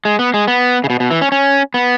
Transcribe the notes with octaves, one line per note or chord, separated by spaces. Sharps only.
G#3
B3
G#3
B3
C#3
B2
B2
E3
C#4
C#4
B3